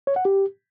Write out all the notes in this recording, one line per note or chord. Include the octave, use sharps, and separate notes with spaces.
C#5
F#5
G4